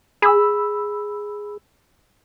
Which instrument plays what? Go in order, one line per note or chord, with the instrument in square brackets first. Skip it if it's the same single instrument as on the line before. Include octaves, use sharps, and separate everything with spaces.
[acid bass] G#4 [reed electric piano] B5 E6